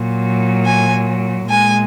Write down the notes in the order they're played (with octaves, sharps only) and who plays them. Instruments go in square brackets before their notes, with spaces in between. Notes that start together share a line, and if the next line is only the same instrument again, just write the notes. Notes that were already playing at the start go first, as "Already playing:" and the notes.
Already playing: [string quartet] A#2 F#3
G#5
A#2 G#3 G#5